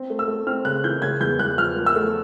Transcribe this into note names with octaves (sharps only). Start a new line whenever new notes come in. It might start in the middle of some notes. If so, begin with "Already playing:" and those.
Already playing: C4
A3
E6
A3
C4 F6
C#3 F#6
E3 G6
C#3 G#6
E2 G6
E2 F#6
F3 F6
F3
E6
A3